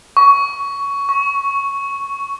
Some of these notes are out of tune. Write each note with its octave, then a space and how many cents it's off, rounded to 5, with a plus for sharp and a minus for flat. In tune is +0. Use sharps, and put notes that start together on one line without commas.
C#6 +15
C#6 +0